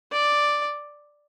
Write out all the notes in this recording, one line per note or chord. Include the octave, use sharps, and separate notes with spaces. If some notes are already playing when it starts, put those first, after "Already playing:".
D5